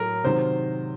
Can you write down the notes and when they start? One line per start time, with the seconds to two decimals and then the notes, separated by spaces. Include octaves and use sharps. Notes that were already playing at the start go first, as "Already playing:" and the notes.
Already playing: A2 F#3 A#4
0.24 C3 D#3 F#3 C5